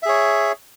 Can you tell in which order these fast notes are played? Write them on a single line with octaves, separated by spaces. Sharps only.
E5 G#4 C#5